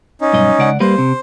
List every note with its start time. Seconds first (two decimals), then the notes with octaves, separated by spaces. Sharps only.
0.21 C#4 D#4
0.33 B1 G2 D#5
0.58 C#2 D5 F#5
0.80 G3 A#3 B4 C5
0.98 C3